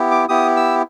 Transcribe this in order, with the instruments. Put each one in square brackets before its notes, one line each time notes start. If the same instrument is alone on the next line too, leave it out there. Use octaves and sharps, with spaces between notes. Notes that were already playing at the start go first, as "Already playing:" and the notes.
Already playing: [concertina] B3 E4 G4
D6
B3 E4 G4 D#6
E6